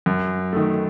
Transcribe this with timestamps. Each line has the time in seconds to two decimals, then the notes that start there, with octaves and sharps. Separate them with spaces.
0.06 F#2
0.53 D#3 A3